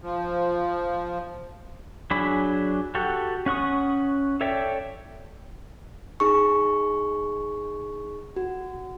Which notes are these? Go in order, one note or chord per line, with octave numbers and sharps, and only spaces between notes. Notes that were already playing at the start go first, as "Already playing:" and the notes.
F3
F#3 D4 G#4 B5
F#4 G4 A4 F#5
C#4 F#5 C#6 D#6
A4 C#5 D5 E5 G5
D#4 G#4 C#6
F#4